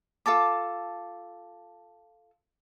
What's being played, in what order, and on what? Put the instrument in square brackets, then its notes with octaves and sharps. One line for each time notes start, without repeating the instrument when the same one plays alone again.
[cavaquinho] F4 A4 A5 D6